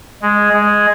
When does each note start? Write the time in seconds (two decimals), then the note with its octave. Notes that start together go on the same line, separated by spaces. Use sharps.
0.22 G#3
0.53 G#3